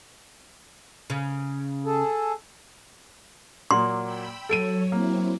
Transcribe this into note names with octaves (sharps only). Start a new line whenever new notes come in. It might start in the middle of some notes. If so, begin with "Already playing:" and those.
C#3
G#4 A4
A#2 F#3 A#3 C6
G5 B5 E6
F#3 A4 C#5 D7 D#7
F#3 A#3 C4 E4